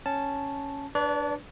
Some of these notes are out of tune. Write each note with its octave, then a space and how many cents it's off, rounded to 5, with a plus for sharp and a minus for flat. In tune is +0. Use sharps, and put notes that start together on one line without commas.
C#4 +0 A5 +0
D4 +0 B4 +0 D5 -40